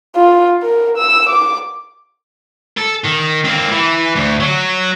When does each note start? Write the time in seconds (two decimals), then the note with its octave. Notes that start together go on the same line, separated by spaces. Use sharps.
0.16 F4
0.63 A#4
0.97 E6
1.29 D6
2.78 A4
3.05 D#3
3.45 A#3 C4
3.72 E3
4.15 D2
4.40 F#3 F#4